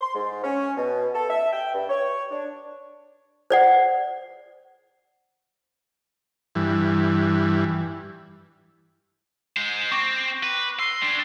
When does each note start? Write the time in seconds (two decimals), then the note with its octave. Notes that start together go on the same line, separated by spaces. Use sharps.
0.01 C6
0.15 G#2
0.43 C#4
0.77 B2
1.14 A4
1.30 E5
1.53 G5
1.74 G2
1.90 C#5
2.31 D4
3.50 C5 D5 F#5
6.55 G2 E3
9.57 G#3 C5
9.92 C4 C#6 D6 A#6
10.43 B4
10.79 C6 E6 C7 G7
11.02 G3 D4